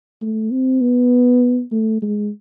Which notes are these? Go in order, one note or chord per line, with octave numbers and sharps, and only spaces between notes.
A3
C4
B3
A3
G#3